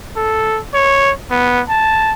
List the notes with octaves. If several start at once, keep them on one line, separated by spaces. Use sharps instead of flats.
A4
C#5
B3
A5